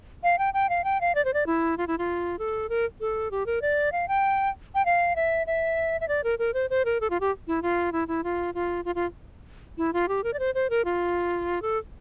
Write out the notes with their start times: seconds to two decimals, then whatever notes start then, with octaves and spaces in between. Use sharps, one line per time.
0.23 F5
0.39 G5
0.54 G5
0.69 F5
0.84 G5
1.01 F5
1.15 D5
1.25 C5
1.34 D5
1.46 E4
1.78 F4
1.87 E4
1.98 F4
2.39 A4
2.69 A#4
3.00 A4
3.31 G4
3.46 A#4
3.62 D5
3.92 F5
4.08 G5
4.75 G5
4.85 F5
5.16 E5
5.47 E5
6.01 E5
6.08 D5
6.24 A#4
6.39 A#4
6.54 C5
6.70 C5
6.85 A#4
7.01 A4
7.10 F4
7.20 G4
7.47 E4
7.62 F4
7.92 E4
8.08 E4
8.24 F4
8.54 F4
8.85 F4
8.95 F4
9.78 E4
9.93 F4
10.08 G4
10.24 A#4
10.33 D5
10.39 C5
10.55 C5
10.70 A#4
10.85 F4
11.62 A4